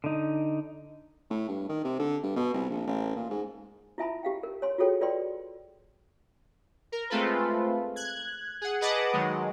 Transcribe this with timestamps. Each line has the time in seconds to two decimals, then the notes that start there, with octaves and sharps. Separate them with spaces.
0.04 D3 D#4
1.30 A2
1.48 G2
1.69 D#3
1.84 C3
1.99 D3
2.23 G2
2.36 B2
2.54 C2
2.70 A#1
2.87 A1
3.16 A#2
3.30 G#2
3.98 E4 F4 E5 G#5 A5 B5
4.23 G4 F5 G5
4.43 A#4
4.62 C#5 G#5 C6
4.78 F4 F#4 G#4 A4 C#5 G5
5.01 F4 B4 D5 G5 C6
6.92 A#4
7.10 G#3 A3 C4 F4 A4 B4
7.96 F#6 G#6
8.61 G#4 F#5
8.81 G#4 B4 D#5 F#5 A5 D6
9.13 D#3 F#3 G#3